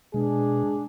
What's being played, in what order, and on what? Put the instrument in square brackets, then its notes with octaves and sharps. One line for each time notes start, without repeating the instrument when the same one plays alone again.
[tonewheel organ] B2 [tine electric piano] G#3 [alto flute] D4 [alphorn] G#4